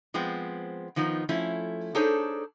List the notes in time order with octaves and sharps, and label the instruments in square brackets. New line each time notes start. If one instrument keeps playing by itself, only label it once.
[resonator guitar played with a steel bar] F3 G#3 B3 C4
D#3 F3 B3 D#4
F3 A3 C#4 E4
D4 D#4 G#4 A4 C5 C#5